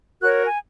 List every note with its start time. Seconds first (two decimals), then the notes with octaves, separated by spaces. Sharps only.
0.21 F#4 A#4 C#5 F#6
0.45 G#5